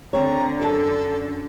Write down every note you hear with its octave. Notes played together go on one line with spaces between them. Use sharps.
D3 C4 C#5 A#5
F#2 G#4 A4 A5